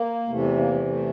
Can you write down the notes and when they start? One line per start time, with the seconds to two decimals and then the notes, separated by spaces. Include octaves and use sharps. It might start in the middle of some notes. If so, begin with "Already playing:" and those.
Already playing: A#3
0.28 E2 C3 E3 A3
0.57 A#3
0.72 A3
0.86 A3